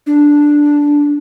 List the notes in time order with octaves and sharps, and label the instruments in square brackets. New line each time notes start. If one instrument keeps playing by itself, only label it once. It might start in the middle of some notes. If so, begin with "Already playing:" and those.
[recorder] D4